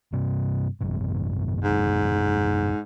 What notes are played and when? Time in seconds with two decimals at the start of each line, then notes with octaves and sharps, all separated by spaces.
0.13 G2 C3
0.81 G#1 F#2 B2
1.64 G#2